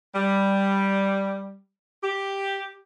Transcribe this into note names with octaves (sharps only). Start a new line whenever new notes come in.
G3
G4